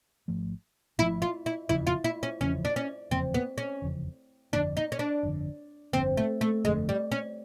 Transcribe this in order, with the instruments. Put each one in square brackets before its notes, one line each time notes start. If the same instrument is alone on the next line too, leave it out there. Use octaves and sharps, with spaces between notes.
[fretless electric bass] G#1 G#2 F3 A3
[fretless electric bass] G#1 G#2 F3 A3 [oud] E4
[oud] F4
E4
[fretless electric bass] F1 E2 C#3 F3 [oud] E4
[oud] F4
E4
C#4
[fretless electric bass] F1 E2 C#3 F3 [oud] C#4
[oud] D4
C#4
[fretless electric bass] F1 E2 C#3 F3 [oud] C4
[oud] B3
C#4
[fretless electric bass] F1 E2 C#3 F3
[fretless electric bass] G1 F2 D3 [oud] D4
[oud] D#4
C#4
D4
[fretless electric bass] G1 F2 D3
[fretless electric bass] G1 F2 D3 [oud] C4
[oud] A3
A3
[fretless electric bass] G1 F2 D3 [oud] G#3
[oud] G3
C#4